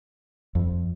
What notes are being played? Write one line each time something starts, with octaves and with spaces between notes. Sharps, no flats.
F2